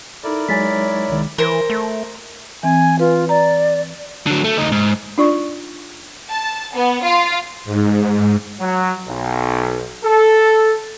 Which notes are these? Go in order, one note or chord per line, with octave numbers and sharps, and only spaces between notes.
D#4 E4 A4 A#4 D5
F#3 G#3 D#4 C#5 G#5 A6 B6
C2 D#3 G#3
E3 A#4 C5
A3
E3 C4 G#5
F4 B4
D5 A#5
D3 F#3
A3
D2 D#4
G#2
D4 D#4 F4 D5 C#6
A5
B3
F4 F5
G#2
F#3
B1
A4